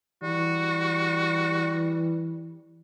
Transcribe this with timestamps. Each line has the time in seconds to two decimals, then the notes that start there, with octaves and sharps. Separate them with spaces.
0.22 E3 G3 F#4